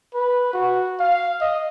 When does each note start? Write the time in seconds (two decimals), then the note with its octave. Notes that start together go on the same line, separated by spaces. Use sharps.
0.15 B4
0.53 F#4
0.99 F5
1.40 D#5